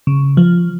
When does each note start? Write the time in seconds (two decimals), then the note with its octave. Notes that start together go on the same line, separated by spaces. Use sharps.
0.07 C#3
0.37 F3